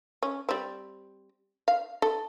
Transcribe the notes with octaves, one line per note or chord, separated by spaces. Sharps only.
C#4
G3 C4
F5
A4